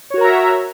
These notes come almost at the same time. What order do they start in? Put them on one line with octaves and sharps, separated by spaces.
C#5 F#4 A#4 A#5 E5